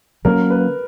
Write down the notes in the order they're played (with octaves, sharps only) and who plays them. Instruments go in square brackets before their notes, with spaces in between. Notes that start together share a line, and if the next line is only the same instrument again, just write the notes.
[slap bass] D3 F#3 A#3 C#4 [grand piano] A#4
[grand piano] B4